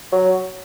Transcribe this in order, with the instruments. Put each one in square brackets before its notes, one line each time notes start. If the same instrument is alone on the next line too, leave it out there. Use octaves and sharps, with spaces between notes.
[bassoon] F#3